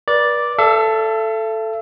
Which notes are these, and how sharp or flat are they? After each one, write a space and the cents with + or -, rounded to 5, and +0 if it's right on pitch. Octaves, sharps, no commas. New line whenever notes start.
B4 -40 D5 +0
A4 +0 E5 +45